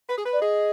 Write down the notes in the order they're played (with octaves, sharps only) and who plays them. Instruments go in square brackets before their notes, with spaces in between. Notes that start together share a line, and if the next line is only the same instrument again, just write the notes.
[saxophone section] B4
G#4
B4
[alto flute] D5
[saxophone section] G#4 [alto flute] D#5